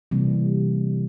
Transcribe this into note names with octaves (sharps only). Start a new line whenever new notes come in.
C3 E3 G3 A#3